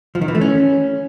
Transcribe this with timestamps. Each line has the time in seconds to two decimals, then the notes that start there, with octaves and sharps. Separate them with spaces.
0.15 F3
0.22 D#3
0.28 E3
0.35 A3
0.41 C#4